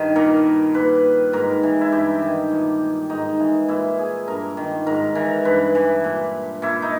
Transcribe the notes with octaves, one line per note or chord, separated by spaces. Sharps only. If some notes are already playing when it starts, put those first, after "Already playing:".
Already playing: G2 D#3
A#2 A#4
A#2 B4
G#2 A#4
E3
E4
G2 G4
D#3
A#2
G#2 D#4
E3
A#2 E4
G#4
G2 A#4
D#3
G#2 A#4
E3 A#4
G2 B4
E3
A#2
A#2 E4
D#4